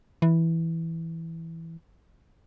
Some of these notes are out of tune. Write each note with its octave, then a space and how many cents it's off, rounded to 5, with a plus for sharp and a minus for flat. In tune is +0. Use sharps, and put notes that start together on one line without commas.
E3 -5